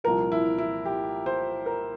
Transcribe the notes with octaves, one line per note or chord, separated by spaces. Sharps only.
C2 A#2 F3 A#4
E4
E4
G4
C5
A#4